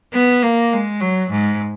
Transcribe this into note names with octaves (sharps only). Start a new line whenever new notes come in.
B3
A#3
G#3
F#3
G#2